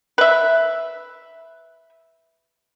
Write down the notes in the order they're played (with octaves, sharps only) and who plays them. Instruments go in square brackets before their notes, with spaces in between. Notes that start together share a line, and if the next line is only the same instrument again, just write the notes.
[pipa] B4 E5